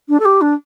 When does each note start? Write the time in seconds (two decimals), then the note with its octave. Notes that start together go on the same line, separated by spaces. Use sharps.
0.08 D4
0.19 A4
0.25 G4
0.41 D4